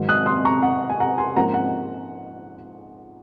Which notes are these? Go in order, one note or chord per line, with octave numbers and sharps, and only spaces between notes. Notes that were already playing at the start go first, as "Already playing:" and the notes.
Already playing: G#2 D#3 F#3
D#6 F#6
C6 D#6
A#5 C#6
F#5
G#5
F#5 A#5
G#5 C6
G#2 F3 A#3 C#4 F#5 A#5
F#5